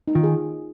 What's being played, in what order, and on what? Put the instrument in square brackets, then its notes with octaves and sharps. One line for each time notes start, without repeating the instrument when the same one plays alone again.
[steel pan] D#4
[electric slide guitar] D#3 [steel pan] F4
[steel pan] G#4